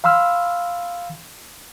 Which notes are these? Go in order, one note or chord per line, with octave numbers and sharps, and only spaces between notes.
F5 B5 C6 E6 F6